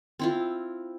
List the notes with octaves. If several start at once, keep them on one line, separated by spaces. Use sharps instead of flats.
C4 E4 F4